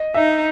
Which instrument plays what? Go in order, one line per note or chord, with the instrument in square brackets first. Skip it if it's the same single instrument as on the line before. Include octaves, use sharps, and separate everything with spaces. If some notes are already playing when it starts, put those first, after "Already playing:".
Already playing: [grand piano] D#5
[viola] D#4 [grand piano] E5